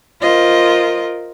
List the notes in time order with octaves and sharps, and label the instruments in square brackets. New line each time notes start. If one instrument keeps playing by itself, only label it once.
[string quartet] F4 A#4 C5 D#5